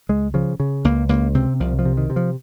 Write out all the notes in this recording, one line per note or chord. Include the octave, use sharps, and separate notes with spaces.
C#2 G#3
C#3 F3
C#3
C#2 A#3
C#2 A#3
C3 C4
C2 F3
F3
C3
D#3
C3
F3